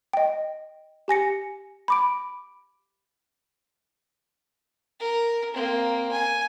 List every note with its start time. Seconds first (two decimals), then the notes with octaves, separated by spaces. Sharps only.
0.13 D#5 G5
1.08 G4 G#5 A#6 C#7
1.88 B5 D6 D7
5.00 A#4
5.54 A#3 C4
6.11 G#5